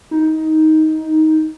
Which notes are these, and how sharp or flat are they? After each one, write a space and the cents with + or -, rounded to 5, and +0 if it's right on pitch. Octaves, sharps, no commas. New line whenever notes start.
D#4 +15